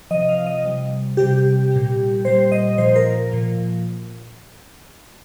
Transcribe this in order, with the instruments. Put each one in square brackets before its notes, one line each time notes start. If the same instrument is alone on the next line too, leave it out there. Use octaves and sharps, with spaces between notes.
[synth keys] C3 F3 D#5
F5
D#5
C3 G3
C3 G3 G4
A#2 G3
A#2 G3 C5
D#5
A#2 F3 C5
A#4
A#2 F3